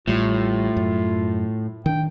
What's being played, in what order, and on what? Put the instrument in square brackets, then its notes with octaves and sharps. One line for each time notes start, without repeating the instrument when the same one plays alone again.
[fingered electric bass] A1 G3 [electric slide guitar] A2 [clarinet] F4
[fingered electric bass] F#2
[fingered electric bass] D#3 D4 [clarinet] G5